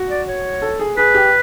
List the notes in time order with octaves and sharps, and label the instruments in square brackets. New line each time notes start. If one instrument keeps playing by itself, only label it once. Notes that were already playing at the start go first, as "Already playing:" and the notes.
Already playing: [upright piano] F#4
[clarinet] D5
C#5
[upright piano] A4
G#4
[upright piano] G#4 [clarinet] B4
[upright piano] G4